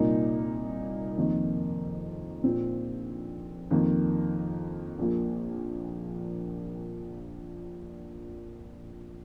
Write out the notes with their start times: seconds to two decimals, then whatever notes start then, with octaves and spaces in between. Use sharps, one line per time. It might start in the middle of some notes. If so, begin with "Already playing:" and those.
Already playing: C2 A#2 A#3 D#4
1.17 F2 D#3 A#3 D#4
2.44 A#1 A#2 F3 C4
3.71 F2 D#3 A#3
4.99 A#1 A#2 A#3